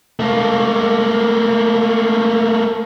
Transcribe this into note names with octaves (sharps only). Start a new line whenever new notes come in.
A3 A#3